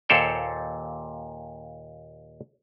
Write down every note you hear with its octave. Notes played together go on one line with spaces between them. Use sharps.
D#2 A#2 A4 C5 C#5 G5